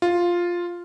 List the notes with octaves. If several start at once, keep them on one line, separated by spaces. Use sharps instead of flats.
F4